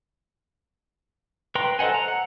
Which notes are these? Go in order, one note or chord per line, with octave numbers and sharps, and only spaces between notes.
B4 G5 A#5 C6
A4 C5 D#5 F#5 G#5
A#5
F#5